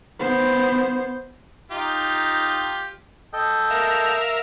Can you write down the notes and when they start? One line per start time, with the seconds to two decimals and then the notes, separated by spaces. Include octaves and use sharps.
0.20 B3 C5
1.71 D#4 F4 G4
3.33 A4 D#5 G5
3.71 A#4 E5 F5